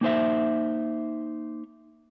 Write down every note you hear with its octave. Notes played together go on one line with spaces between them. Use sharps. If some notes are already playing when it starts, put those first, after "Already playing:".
A#3 D#4 C5 E5